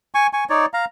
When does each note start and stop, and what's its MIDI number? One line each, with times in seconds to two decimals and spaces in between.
0.15 0.27 80
0.15 0.27 85
0.33 0.44 80
0.33 0.44 85
0.50 0.66 63
0.50 0.66 73
0.50 0.66 74
0.74 0.85 77
0.74 0.85 82